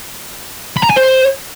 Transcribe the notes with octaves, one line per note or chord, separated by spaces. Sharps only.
B5
A#5
G#5
C5